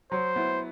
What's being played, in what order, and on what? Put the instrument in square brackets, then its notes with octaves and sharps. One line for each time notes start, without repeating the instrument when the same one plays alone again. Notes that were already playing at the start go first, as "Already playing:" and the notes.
[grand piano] F#3 [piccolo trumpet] C5
[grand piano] B3 E4